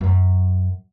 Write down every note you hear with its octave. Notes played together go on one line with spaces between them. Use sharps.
F#2 F#3